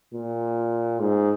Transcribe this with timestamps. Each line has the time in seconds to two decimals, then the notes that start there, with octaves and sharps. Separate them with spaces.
0.13 A#2
1.00 G#2